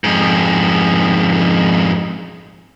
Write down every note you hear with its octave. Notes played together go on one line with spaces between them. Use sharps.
F2 G#2